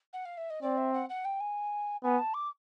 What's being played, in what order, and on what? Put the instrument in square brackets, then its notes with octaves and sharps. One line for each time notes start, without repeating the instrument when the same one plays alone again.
[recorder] F#5
F5
E5
D#5
[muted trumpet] C4 [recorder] D5
[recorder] E5
F#5
F#5
G5
G#5
[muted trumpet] B3 [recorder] G#5
[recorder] A5
D6